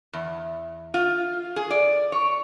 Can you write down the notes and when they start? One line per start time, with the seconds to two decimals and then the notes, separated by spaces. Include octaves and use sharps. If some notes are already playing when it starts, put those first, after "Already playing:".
0.13 E2
0.94 F4
1.56 G#4
1.71 D5
2.12 C#5